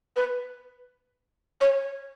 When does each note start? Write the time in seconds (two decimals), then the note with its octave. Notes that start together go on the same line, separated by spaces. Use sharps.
0.16 B4
1.61 C#5